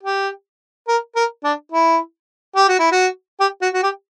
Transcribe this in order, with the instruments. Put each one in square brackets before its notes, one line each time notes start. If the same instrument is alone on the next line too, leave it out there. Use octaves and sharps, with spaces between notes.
[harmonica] G4
A#4
A#4
D4
E4
G4
F#4
E4
F#4
G4
F#4
F#4
G4